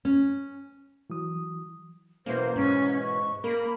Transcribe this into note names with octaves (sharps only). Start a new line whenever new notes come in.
C#4
E3 F#3 D#6
F#2 B2 E3 A#3 C5
G#2 C#4
C#6
A#3 A#4 B5